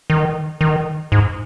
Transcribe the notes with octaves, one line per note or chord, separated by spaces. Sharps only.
D#3
D#3
G#2